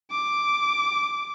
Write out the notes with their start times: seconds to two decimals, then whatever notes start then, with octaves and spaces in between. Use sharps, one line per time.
0.12 D6